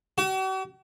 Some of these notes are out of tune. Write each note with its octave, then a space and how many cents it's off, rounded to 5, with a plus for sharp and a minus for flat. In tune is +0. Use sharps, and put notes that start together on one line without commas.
F#4 +45